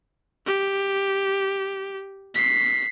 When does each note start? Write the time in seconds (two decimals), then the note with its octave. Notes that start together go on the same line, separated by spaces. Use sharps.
0.46 G4
2.34 B6 C7